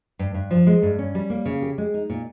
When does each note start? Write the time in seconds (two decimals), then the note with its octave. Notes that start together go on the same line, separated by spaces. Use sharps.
0.19 G2
0.34 G2
0.51 F3
0.67 G#3
0.82 G2
0.99 C#4
1.15 G3
1.30 A#3
1.45 C#3
1.62 G4
1.78 G#3
1.94 D#4
2.10 A#2